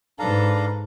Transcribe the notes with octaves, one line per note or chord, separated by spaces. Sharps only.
G#2 D4 A4 B4 F5 A#5